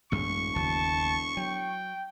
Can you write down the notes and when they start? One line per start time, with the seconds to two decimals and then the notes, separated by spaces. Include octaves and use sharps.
0.12 E1 A1 F#2 G#3 C#6
0.56 F#1 D#2 F#3 A5
1.37 F#3 G5